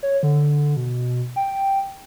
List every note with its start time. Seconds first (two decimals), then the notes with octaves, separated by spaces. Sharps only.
0.03 C#5
0.23 D3
0.76 B2
1.36 G5